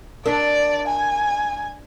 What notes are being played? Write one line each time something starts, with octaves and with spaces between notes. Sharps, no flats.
D4 A#4 D5
G#5